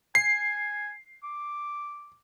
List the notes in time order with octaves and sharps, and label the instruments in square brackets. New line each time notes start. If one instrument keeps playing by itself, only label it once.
[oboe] G#5 [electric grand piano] C7
[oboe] D6